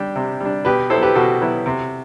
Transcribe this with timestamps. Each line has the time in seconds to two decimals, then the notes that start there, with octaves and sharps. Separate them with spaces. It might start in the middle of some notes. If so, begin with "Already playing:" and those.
Already playing: G3 D4 G4
0.15 C3
0.40 G3 D4
0.65 B2 G4 B4
0.90 F#3 B3 E4 A4 C5
1.02 G4 B4
1.15 B2 F#4 A4
1.41 F#3 B3 E4
1.66 C3